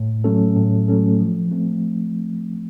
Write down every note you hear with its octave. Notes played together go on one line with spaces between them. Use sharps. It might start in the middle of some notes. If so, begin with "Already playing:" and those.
Already playing: A2
F#3 A3 C#4 A4
A2
F#3 A3 C#4 A4
F3
A3 C4